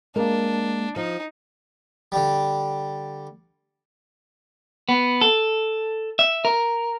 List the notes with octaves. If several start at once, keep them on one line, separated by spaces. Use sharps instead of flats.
G#3 A#3 D4 A#4
F3 D#4
D3 G3
B3
A4
E5
A#4